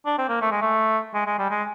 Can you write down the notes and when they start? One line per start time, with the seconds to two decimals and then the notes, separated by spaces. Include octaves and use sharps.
0.06 D4
0.18 C4
0.29 A#3
0.42 A3
0.51 G#3
0.61 A3
1.14 G#3
1.26 G#3
1.38 G3
1.50 G#3